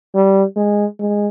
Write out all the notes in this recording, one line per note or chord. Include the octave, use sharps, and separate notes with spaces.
G3
G#3
G#3